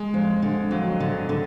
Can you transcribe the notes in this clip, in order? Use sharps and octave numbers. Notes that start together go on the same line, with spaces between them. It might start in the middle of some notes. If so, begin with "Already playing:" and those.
Already playing: G#3
F2
D3
F2 F#3
D3
D3